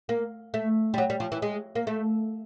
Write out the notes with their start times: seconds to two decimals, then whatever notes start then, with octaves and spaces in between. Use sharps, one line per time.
0.09 A#3
0.54 A3
0.94 G3
0.98 F#3
1.10 G3
1.20 F3
1.32 E3
1.42 G#3
1.76 A#3
1.87 A3